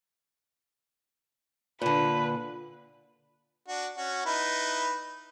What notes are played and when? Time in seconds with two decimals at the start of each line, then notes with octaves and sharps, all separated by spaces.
1.82 A#2 D3 B4
3.68 D4 F#4
3.97 C#4 F#4
4.26 D#4 E4 B4